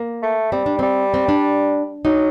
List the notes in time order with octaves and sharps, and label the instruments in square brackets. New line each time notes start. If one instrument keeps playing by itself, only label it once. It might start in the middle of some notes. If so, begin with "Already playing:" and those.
Already playing: [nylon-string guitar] A#3
[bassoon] A3
[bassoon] G3 [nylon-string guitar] C4
[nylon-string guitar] D4
[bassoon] G3 [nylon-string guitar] C4
[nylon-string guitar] C4
D4
[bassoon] F#3 [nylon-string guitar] D#4